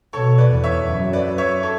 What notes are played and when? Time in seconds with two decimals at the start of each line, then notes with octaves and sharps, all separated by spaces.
0.13 B2 A4 C#5
0.38 B4 D5
0.51 E2
0.64 C#5 E5
0.88 F#2
1.13 B4 D5
1.38 C#5 E5
1.63 A4 C#5